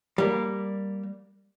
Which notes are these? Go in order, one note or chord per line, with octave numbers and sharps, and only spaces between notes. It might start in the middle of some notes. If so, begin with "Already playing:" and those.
G3 A#3